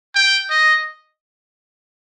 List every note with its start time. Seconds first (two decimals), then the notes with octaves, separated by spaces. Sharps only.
0.16 G5
0.50 D#5